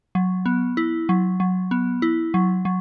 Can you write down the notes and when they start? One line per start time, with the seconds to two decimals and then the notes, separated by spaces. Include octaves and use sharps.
0.15 F#3
0.46 B3
0.77 E4
1.09 F#3
1.40 F#3
1.71 B3
2.02 E4
2.34 F#3
2.65 F#3